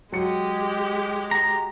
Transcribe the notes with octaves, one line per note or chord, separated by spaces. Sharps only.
F#3 G#3 G4 C#7
A#5